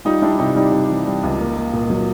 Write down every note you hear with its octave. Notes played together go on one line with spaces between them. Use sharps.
G3 D#4 F4
G3 D4 E4
C3 D#4
G3 D#4
C3
E3
G3
C#2
A#3
A#3
A#2
F#3